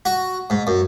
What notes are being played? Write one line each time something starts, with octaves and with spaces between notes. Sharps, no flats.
F#4
G#2
F#2